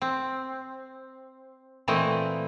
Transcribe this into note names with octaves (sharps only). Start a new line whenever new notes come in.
C4
A#2 E3 A3 C4 D#5